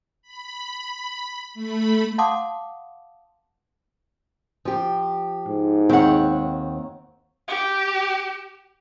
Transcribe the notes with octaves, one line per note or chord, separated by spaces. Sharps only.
B5
A3 B5
F5 F#5 A5 C6 D6 D#6
F3 G4
G#2
D#2 C4 C#5 F#5
G4